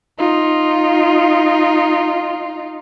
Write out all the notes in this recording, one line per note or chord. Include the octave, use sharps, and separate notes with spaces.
D#4 F4